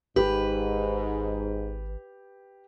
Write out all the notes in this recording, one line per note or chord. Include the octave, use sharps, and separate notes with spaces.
G#1 G#2 G4 B4